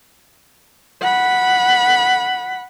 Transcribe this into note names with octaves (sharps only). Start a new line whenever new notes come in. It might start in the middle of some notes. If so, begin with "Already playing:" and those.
F#5 B5